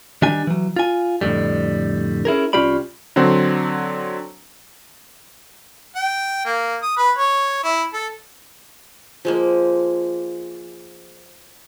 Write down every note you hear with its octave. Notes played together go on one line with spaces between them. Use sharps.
D#3 G3 D4 G#5
E3 F#3
F4 G#5
F2 A2 D3 G3
C#4 E4 G#4 A#4
C2 C#4 F4 G4 D5 B5
D3 F#3 C4
G5
A#3
D#6
B4
C#5
E4
A4
F3 G#3 A#3